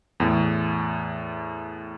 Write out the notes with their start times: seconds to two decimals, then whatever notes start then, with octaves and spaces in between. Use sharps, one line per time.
0.20 E2 A2